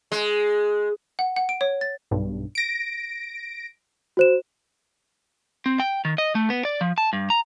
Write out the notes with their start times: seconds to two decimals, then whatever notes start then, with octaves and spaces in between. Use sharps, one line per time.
0.12 G#3
1.19 F#5
1.36 F#5
1.49 D7
1.61 C#5
1.81 A6
2.11 B1 G2
2.55 A#6 D7
4.17 F#4 C5 E7
5.66 C4
5.80 G5
6.05 D#3
6.18 D#5
6.35 A3
6.50 B3
6.65 D5
6.81 F3
6.98 A5
7.13 G2
7.30 A#5